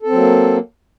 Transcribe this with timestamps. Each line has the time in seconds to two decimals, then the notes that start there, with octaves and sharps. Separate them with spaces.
0.02 A4
0.07 C4
0.12 F#3
0.17 A#3